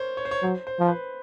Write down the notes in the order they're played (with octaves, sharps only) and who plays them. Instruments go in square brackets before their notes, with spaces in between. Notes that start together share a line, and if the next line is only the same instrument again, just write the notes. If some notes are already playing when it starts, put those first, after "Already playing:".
Already playing: [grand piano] A#4 C5 C#5
C#5
C5
C#5
[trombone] F#3 [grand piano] C5
[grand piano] C5
[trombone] F3
[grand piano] B4
C5